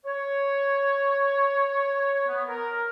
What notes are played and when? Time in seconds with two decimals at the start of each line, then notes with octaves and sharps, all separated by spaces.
0.06 C#5
2.27 B3
2.48 A#4